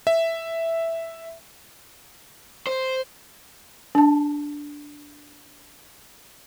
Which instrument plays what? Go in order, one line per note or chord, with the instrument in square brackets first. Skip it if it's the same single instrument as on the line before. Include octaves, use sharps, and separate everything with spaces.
[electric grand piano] E5
[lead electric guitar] C5
[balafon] D4 A5